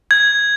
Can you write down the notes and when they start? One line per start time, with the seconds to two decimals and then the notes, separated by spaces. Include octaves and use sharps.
0.11 G#6